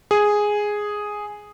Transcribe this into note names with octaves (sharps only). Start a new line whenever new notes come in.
G#4